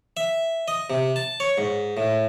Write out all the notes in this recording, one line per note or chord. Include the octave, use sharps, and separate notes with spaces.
E5
D#5
C3
A5
C#5
G#2
A2